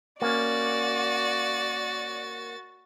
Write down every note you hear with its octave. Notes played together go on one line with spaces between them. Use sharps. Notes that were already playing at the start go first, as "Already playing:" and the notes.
A#3 C#4 F#4 D5 A6